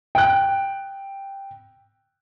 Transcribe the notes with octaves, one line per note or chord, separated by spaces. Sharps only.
G5 F#6